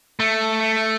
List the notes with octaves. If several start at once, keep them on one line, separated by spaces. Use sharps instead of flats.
A3